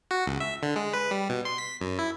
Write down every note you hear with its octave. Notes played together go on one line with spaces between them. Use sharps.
F#4
C#2
E5
D3
G#3
B4
G3
B2
C6
B6
F#2
E4